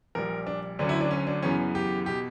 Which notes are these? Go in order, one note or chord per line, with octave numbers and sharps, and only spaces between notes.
A#1 A#2 G3 A#4
D4
D2 D3 F#3 C#4 D4
E4
D4
C#4
D4
F#2 C#3 E3 B3 C#4
G4
B2 G4